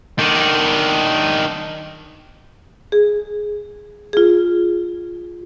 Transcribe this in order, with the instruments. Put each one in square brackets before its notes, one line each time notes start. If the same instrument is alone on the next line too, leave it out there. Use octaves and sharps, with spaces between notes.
[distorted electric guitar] D#3 D4
[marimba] G#4
F4 G#4